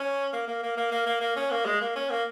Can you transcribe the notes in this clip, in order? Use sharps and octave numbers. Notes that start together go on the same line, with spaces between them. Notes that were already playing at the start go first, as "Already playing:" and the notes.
Already playing: C#4
A#3
A#3
A#3
A#3
A#3
A#3
A#3
C#4
A#3
G#3
A#3
C#4
A#3